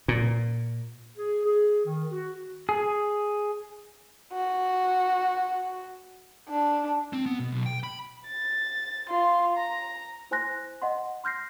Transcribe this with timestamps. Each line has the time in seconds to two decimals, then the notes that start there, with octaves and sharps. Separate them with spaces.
0.08 A#2
1.17 G#4
1.43 G#4
1.84 D#3
2.11 F#4
2.69 G#4
4.33 F#4
6.49 D4
7.13 C4
7.26 B3
7.40 B2
7.52 B1
7.66 G5
7.84 B5
8.28 A6
9.09 F4 C6
9.57 A#5
10.31 E4 C5 G#5 C6 F#6 A#6
10.82 D#5 F#5 C6
11.24 C6 F6 G6 A#6 C7